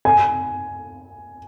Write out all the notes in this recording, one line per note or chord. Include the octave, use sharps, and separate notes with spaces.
G#5